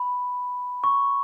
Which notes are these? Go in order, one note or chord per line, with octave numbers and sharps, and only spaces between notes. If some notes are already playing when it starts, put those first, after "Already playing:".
Already playing: B5
C#6